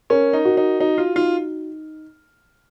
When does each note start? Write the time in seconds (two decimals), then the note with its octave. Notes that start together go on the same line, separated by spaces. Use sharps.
0.10 C#4 A#4
0.33 D#4
0.45 F#4
0.57 D#4
0.80 D#4 F#4
0.98 F4
1.15 D#4 F4